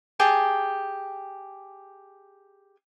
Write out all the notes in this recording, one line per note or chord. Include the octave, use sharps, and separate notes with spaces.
G4 G#4 G5 A5